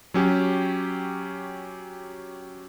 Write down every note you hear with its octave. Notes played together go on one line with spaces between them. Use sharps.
F#3 C#4 G4